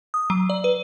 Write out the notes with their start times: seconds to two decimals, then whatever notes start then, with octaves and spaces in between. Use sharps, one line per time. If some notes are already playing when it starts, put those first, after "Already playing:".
0.14 D#6
0.30 F#3
0.50 D5
0.64 B4